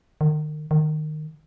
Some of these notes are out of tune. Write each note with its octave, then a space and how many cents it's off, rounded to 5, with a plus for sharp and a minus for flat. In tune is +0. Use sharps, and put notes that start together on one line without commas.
D#3 -35
D#3 -20